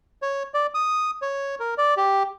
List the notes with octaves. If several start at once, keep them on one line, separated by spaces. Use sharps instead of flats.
C#5
D5
D#6
C#5
A#4
D5
G4